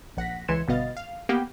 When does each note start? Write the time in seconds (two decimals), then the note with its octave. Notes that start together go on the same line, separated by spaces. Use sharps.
0.17 A#1 F#5 A#6 B6
0.48 C#2 E3 C6 G#6 C#7 E7
0.68 G1 B2 B3 D#5 F5 A6
0.97 F5
1.29 A#3 B3 G4 G5